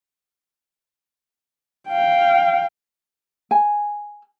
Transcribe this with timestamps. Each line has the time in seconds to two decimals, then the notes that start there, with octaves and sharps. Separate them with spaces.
1.88 F5 G5
3.51 G#5